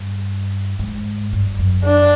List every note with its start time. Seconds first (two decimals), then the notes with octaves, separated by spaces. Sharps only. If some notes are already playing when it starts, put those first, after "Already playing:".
Already playing: G2
0.79 G#2
1.33 G2
1.59 F#2
1.85 D4